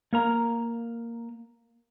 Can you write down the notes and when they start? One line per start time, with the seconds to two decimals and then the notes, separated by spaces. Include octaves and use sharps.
0.13 A#3 A#4 A#5